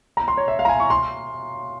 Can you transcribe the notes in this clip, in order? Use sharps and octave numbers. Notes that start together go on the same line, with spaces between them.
A#5
C6
C#5
E5
F5
A#5
G#5
C#6
C6